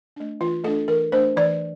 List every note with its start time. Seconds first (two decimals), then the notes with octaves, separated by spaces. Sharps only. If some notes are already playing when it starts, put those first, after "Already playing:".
0.16 A3 D4
0.41 E3 F4
0.64 A3 D4 A4
0.88 E3 A#4
1.12 A3 D4 C5
1.36 E3 D5